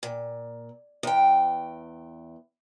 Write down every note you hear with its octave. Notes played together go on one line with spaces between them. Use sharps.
A#2
E2 G5